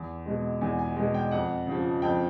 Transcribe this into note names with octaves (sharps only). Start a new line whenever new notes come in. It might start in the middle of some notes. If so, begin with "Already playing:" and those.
Already playing: E2
B2 G#3
E2 G#5
G#5
B2 G#3 G#5
G5
F2 F#5
C#3 F3
F2 G5